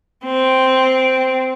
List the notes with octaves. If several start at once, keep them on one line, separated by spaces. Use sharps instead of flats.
C4